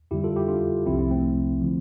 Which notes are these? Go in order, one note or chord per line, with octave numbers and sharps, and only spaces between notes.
F2 D3 G3 E4 G4
F4 A4
E4 G4
D4 F4
C2 C3 F3 C4 E4
C4 E4
A3 C4
D3 F3